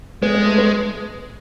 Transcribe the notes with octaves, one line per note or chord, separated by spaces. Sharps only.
G#3 B3
B3
A3
B3